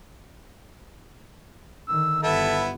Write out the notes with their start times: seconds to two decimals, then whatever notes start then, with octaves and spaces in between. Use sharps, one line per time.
1.88 D3 D#3 E6
2.23 G1 B3 E4 A4 E5